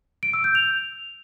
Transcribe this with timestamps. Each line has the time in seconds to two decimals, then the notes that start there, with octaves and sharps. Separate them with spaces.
0.23 D7
0.33 E6
0.44 G6
0.55 F7